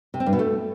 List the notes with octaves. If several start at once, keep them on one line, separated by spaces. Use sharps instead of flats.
C3
C4
G2
B2
A3